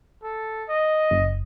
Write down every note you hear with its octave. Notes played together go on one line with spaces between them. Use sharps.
A4
D#5
F#1